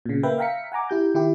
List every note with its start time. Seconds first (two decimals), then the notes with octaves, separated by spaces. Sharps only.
0.06 A#2 C#3
0.23 A#3 B4 E5 G5
0.38 E5 F5 G5 A#5 B6 C#7
0.72 F#5 G#5 A#5 D6
0.89 E4 G4 G6
1.14 D#3 E4 G4